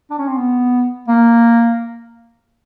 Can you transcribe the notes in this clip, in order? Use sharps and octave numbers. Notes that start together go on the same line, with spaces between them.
D4
C#4
C4
B3
A#3